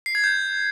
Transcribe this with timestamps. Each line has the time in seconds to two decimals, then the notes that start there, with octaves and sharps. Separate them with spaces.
0.06 C7
0.15 G#6
0.24 G6